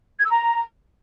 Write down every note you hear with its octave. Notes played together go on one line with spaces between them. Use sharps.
G#6
E6
A#5